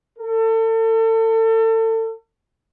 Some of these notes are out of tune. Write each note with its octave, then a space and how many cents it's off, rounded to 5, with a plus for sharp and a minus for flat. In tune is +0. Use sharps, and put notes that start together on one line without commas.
A4 +35